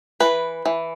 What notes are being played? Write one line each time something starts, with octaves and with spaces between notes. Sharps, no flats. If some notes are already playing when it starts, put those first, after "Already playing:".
E3 B4
E3